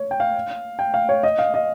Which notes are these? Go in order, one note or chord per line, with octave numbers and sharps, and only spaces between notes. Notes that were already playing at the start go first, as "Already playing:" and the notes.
Already playing: C#5
G5
F5
G5
F5
C#5
D#5
F5
D#5